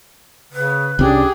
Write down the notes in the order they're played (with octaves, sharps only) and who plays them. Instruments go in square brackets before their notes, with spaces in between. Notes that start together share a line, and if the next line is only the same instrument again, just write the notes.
[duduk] C#3 [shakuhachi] B4
[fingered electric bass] C2 C#4 [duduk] D4 [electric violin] G4 G#4